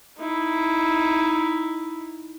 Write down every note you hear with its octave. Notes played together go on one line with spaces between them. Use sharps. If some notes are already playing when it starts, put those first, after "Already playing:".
D#4 E4